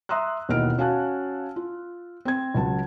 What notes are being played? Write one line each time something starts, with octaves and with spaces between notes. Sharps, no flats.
E5 A#5 C6 D#6 E6 F#6
D#2 B2 E3 D#5 F6 D7
C#4 F#4 F5 G#5 A5 F#6
F4
C4 G#6
C#2 F#3 A5